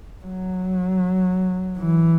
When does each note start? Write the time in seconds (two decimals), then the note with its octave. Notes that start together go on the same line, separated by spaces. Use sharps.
0.25 F#3
1.79 E3